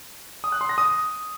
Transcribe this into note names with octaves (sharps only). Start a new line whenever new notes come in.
D#6
F#6
C6
A#6
D#6